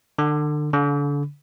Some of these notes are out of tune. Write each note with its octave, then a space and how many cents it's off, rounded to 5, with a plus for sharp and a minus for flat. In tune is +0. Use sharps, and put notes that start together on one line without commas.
D3 +30
D3 -35